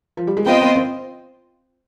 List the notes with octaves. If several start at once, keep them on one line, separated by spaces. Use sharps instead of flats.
F3
G3
G#3
B3 C4 F4 C5 D#5 G5
B3
C4